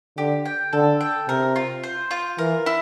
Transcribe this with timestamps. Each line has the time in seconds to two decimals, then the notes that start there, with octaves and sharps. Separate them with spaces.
0.17 D3 G4
0.46 G5
0.73 D3 A4
1.01 G5
1.28 C3 A#4
1.56 F4
1.84 C5
2.11 F4
2.38 E3 A#4
2.66 E4